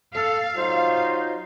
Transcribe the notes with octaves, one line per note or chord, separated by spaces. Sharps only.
A4 F5
F#3 D#4 F4 C5